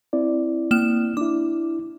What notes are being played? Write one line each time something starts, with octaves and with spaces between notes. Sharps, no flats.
C4 E4 D5
A#3 F6 E7
D4 E4 D6